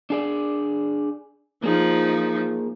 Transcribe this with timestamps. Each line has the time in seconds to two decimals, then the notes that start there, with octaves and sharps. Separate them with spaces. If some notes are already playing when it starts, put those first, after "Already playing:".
0.10 D4 G#4 D5
1.64 F3 A#3 D#4 G#4